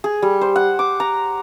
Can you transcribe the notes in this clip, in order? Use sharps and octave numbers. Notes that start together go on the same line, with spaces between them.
G#4
G3
C5
F#5
D6
A#5